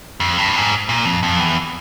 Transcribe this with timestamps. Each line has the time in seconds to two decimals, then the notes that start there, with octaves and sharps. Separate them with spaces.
0.20 F2
0.38 G2
0.55 G#2
0.89 A#2
1.05 F2
1.23 F2
1.40 E2